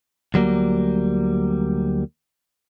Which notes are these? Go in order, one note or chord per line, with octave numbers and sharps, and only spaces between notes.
D2 F#3 G3 A#3